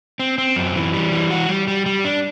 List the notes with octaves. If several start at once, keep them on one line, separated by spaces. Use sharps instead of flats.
C4
C4
F#2
E3
G3
E3
F#4
G3
G3
G3
D4